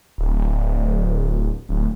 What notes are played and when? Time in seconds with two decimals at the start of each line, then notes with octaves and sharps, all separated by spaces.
0.18 D1
1.69 D1